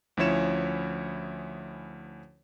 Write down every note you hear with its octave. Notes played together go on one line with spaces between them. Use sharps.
D2 F3 C#4 E4 C#5 E7